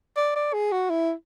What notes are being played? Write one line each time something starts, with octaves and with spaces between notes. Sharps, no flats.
D5
D5
G#4
F#4
E4